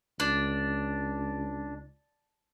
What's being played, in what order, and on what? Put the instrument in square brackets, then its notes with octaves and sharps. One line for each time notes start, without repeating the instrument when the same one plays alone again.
[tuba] C#2 [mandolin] D4